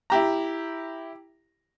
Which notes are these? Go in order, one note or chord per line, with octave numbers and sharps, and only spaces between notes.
E4 G4 A#5